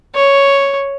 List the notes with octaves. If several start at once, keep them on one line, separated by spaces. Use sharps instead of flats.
C#5